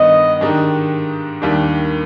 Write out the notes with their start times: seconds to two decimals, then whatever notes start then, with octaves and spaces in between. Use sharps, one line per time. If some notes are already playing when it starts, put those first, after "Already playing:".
Already playing: G2 D#3 B3 D#5
0.41 G#2 D#3 G#3 D4 G4
1.42 D#2 D#3 G3 D4 G4